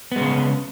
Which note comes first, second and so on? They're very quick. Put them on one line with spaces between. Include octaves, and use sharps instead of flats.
B3 G#3 C#3